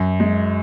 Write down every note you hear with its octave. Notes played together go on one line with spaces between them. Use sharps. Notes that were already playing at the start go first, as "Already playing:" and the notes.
Already playing: F#2
G#3